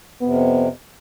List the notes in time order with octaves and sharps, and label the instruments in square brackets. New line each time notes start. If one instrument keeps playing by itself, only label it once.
[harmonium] F2 C3 [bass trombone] B3